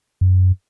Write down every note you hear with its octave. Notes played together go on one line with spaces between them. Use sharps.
F#2